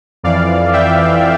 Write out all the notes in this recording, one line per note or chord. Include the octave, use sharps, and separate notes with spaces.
F2 E3 D5 F5
E5 G5